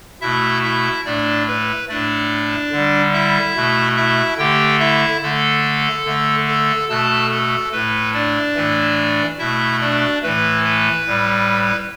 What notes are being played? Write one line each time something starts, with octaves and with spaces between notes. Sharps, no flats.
B2 A3 E4 E5
E4 E5
A2 A3 D4 D5
B4
A2 A3 D4 D5
D3 G3
E4 E5
B2 A3
E4 E5
D3 A3 G4 G5
E4 E5
D3 A3 A4
D3 A3
A4
B2 A3 A4 A5
A4
A2 A3 B4
D4 D5
A2 E3 A3
B2 A3 E4 E5
D4 D5
A2 E3 A3 B4
B4
A2 G3